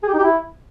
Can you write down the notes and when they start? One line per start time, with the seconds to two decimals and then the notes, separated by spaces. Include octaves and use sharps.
0.03 G#4
0.08 G4
0.13 D#4
0.18 G4
0.24 E4